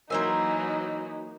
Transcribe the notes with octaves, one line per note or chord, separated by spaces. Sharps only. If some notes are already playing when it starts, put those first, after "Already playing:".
E3 F#3 A#3 D#4 A#4 C5 G#5 E6